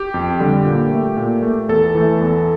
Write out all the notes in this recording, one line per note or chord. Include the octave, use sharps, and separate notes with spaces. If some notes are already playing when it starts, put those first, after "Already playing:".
Already playing: G4
F2
D3 G3
A#2
A3
A#2
A3
E2 A4
E3 A3
E2